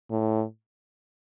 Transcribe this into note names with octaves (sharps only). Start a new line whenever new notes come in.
A2